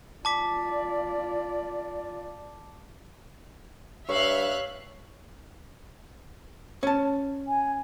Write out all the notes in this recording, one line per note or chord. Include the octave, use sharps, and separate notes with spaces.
F4 D5 A5 D6 B6
G2 C#5 E5 F5 F#6
C#4 A5
G#5